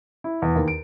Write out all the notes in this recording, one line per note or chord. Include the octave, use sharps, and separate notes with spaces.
E4
E2
D#2
D7